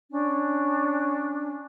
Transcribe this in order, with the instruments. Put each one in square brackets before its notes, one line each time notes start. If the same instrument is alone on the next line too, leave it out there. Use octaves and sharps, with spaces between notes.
[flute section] C#4 D4